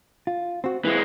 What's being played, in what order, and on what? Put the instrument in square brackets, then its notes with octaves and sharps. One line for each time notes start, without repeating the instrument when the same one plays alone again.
[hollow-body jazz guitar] F4
C4 F#4
[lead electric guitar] E3 G#3 [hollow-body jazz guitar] C4 E4 B4